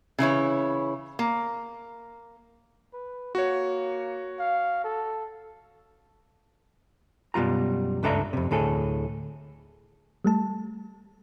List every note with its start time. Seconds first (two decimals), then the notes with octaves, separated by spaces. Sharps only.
0.19 C#3 E3 E4 C#5
1.19 A#3
2.94 B4
3.35 A#3 F#4 C#5
4.40 F5
4.84 A4
7.34 F#2 B2 G3 F4 A#5
8.03 C#2 G2 D4 A4 E5 A#5
8.33 F2 C3
8.51 D2 A2 G#4 A4
10.25 G3 A3 A5